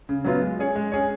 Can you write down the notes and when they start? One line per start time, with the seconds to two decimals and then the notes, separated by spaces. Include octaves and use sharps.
0.09 C#3
0.24 F#3 B3 F4
0.42 G#3
0.59 C#4 G#4 C#5
0.76 G#3
0.92 C#4 G#4 C#5